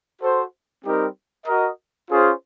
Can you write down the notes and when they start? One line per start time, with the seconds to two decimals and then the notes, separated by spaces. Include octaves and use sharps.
0.21 F#4 A4 C5
0.84 G3 C4 D#4 G4 A#4
1.47 F#4 A#4 D#5
2.10 C#4 F4 G#4 C5